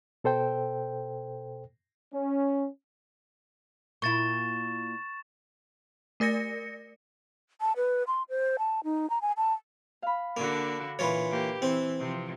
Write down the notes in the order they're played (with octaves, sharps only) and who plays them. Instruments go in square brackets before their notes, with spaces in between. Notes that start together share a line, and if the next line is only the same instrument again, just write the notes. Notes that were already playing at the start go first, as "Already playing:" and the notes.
[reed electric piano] B2 A4 C5 G5
[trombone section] C#4
[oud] A#2 E4 [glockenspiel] C#6 A6 E7
[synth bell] A3 A#4 D5 A#6 C#7
[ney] A5
B4
C6
C5
A5
D#4
A#5
G#5
A5
[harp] F5 B5
[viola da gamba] D3 D4 F#4 [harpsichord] A#3
[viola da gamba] A#2 [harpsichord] E3 F4 C#5 [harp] B4 C#6
[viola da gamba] A#3 G4
[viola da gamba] E3 [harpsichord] C4
[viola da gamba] C3 F3